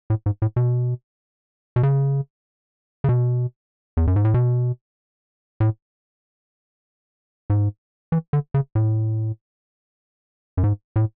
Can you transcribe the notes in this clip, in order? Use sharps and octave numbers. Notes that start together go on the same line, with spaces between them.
A2
G#2
A2
B2
B2
C#3
C#3
B2
E2
F#2
G#2
A2
B2
A2
G#2
E3
D3
C#3
A2
F#2
G#2
A2